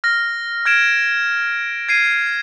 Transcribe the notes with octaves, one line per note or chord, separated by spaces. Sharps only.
F6 A#6
F6 G#6 D7 E7
G#6 C7 D#7